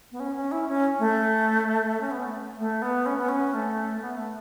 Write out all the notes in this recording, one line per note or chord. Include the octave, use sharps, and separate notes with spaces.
B3
C#4
C#4
E4
C#4
A3
C#4
B3
A3
A3
B3
C#4
B3
C#4
A3
B3
A3